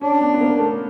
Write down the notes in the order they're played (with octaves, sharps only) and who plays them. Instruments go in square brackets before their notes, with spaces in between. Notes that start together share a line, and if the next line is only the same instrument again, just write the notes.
[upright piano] C#4 [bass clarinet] D4
[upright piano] B3
B3
A#3
A3